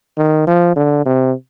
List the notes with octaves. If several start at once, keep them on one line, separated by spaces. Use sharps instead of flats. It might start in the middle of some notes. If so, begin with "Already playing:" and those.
D#3
F3
D3
C3